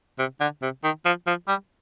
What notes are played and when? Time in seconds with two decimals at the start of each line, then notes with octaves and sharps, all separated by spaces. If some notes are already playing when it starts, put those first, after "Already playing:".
0.19 C3
0.41 D3
0.62 C3
0.84 D#3
1.05 F3
1.27 F3
1.48 G3